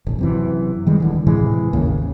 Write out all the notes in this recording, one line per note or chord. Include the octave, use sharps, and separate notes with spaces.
E1 A1
F#2 C3 E3
D#3 G3 G#3
D#1 D3 E3
A2 C3 E3 G#3
G#1 D#2 C#3 A#3